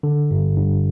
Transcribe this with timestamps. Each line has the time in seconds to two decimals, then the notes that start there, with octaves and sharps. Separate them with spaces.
0.03 D3
0.31 G2
0.57 G2